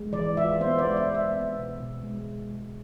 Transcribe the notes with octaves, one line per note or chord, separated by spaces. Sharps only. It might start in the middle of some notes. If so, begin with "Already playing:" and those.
Already playing: G#3
E3 D5
F4 E5
B3 C5
D5
G#3
E5
G#3
E5
B3
B2
B2
G#3